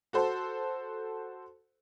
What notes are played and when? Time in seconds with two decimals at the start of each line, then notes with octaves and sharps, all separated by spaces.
0.13 F#4 A4 C5